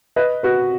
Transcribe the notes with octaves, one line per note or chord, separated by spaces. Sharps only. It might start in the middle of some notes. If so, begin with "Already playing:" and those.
B4 D#5
F#4 B4